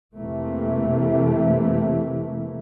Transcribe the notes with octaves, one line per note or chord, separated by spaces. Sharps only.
F1 C3 E3 A3 A#3